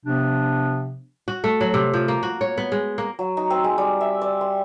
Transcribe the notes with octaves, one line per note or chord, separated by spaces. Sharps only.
C3 F3 B3 D4
F#4
A3
F#3
C3
F3
A#3
F#4
C#5
B3
G#3
A#3
F#3
D#4
C4
G#3
G3
E5
D5
C6